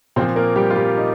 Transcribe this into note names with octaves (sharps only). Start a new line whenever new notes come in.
A#2 F3 C4 C5
A#3 A#4
G3 G4
F4
G3 G4
D#4